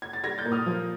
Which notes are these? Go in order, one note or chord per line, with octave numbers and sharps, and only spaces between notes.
G#6
A6
G3 G#6 A#6
G6 A6
A#2
D#6 F6
F3